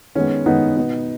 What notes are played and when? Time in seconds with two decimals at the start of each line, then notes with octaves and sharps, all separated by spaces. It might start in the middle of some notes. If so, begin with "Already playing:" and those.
0.15 D#3 G#3 B3 C#4
0.46 D#3 G#3 B3 D#4
0.77 B2 B3